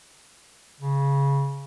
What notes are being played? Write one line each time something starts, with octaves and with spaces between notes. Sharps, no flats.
C#3